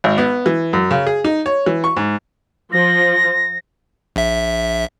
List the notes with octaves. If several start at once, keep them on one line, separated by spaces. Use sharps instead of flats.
G#1
B3
E3
F#2
C#3
G#4
D#4
C#5
E3
C#6
G#2
F3 A#6
A#1 E5